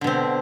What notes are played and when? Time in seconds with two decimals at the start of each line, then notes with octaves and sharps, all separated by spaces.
0.01 D3
0.04 B2
0.07 C4